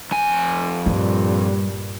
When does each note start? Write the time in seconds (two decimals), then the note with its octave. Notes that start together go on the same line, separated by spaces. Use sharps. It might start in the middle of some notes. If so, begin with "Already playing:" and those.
0.11 F2 G#5
0.86 G2 A#2 G3